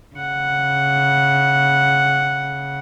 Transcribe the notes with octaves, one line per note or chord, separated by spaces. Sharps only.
C#3 F#5